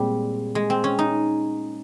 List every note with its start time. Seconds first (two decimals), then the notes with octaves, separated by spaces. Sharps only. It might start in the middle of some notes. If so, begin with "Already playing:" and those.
Already playing: A#2 G3 G#3 C4
0.55 G#3
0.70 C4
0.84 C#4
0.99 D#4